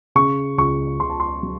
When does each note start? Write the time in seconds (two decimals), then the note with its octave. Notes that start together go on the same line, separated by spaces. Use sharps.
0.15 C#3 C#6
0.58 C#2 C#6
1.00 C#2 C6
1.10 A5
1.20 C6
1.43 F#3